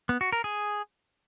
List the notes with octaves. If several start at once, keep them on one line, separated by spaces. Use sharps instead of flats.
B3
F#4
A#4
G#4